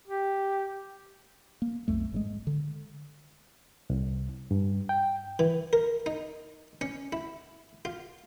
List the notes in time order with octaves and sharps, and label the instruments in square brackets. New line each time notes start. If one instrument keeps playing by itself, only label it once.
[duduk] G4
[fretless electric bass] A#3
B1 F2 A3
G#1 C#3 G#3
D3
[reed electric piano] C2
G2
G5
[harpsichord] E3
A#4
D#4
C#4
E4
F4